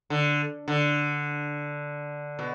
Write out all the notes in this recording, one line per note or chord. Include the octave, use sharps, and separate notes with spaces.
D3
D3
B2